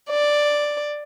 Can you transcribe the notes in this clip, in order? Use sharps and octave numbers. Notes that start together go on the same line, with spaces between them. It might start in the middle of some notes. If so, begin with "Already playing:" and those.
D5